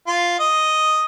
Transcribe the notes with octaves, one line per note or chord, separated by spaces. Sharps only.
F4
D#5